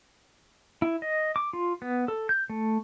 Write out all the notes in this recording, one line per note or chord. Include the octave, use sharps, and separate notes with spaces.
E4
D#5
D6
F4
B3
A4
G6
A3